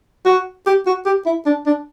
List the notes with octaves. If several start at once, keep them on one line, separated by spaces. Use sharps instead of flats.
F#4
G4
F#4
G4
E4
D4
D4